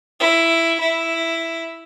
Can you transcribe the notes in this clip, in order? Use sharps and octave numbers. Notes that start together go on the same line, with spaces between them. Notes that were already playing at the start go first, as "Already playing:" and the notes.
E4
E4